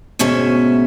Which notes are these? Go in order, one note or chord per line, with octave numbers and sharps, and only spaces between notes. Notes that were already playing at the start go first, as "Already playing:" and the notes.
D2 G#2 B2 C#4 E5